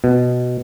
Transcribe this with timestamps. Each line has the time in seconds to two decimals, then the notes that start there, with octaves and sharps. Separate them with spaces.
0.04 B2